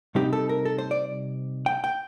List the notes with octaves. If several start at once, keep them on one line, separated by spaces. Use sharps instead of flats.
C3 G3 C4 D#4 G4
A4
A#4
A4
C5
D5
G5
G5